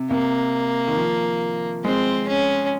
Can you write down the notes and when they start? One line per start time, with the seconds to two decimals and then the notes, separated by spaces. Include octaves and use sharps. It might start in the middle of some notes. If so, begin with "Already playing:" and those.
Already playing: C3
0.10 C3 A#3
0.88 D#3
0.97 F3
1.84 G#3 C4
2.28 C#4